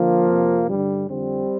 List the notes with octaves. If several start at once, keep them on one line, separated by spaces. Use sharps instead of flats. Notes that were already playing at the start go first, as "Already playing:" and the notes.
Already playing: D3 F3 A#3
F2 C3
G2 D3 G3
F2 D3 G3 C4